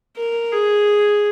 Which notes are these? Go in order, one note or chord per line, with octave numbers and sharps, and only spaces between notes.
A#4
G#4